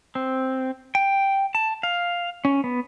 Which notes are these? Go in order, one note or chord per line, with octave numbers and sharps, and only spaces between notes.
C4
G5
A5
F5
C#4
B3